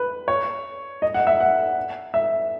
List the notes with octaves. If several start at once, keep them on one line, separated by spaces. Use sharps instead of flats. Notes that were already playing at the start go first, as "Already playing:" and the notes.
Already playing: B4
C#5
D#5
F#5
E5
F#5
E5